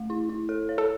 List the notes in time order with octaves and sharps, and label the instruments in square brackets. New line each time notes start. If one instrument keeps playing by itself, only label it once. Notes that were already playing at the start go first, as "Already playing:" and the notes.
Already playing: [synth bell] A3
E4
E4
A4
C#5
[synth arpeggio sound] A4